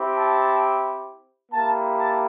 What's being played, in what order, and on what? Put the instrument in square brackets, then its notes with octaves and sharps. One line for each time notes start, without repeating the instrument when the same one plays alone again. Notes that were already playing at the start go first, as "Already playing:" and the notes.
Already playing: [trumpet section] C4 E4 G4
A5
A#3 E4 G4 A5
A5